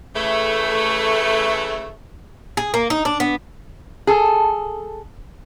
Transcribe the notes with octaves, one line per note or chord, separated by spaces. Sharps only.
C#3 E3 A3
G#4
A#3
D#4
D4
B3
G#4 A4